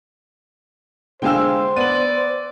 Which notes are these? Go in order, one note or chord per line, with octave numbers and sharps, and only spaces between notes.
D3 G#3 C5 F5 G5 G#5 E6
B3 D5 D#7 F#7